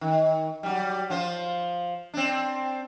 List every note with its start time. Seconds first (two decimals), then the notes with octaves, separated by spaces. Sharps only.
0.01 D#3
0.63 F#3 G3
1.10 F3 F4 C5
2.14 C4 D4